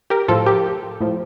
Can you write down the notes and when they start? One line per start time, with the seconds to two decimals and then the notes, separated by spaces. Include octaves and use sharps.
0.10 G4 A#4
0.28 A2 F3 F4 A4
0.46 G4 A#4
1.01 A2 F3